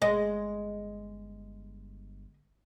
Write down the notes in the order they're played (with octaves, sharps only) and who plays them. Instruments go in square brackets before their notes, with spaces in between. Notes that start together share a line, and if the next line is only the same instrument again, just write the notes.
[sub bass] G1 [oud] G#3 [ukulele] D#5